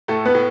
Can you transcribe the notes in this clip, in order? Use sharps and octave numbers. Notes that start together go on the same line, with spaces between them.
A2 A3 A4
B3 B4
A2